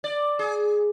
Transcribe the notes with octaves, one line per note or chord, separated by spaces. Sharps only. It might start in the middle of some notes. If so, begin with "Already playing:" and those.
D5
G#4